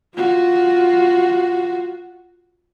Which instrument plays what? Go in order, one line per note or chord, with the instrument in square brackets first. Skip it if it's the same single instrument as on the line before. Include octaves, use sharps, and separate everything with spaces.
[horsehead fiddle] F4 F#4